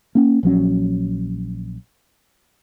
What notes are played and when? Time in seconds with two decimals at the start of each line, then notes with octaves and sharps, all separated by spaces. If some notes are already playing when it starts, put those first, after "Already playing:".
0.15 A#3 C#4
0.43 A#1 F3 F#3 C#4